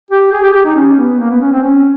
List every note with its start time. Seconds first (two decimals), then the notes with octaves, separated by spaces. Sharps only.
0.11 G4
0.33 G#4
0.43 G4
0.54 G4
0.65 D#4
0.76 C#4
0.98 B3
1.19 A#3
1.31 B3
1.41 C#4
1.52 C4
1.63 C#4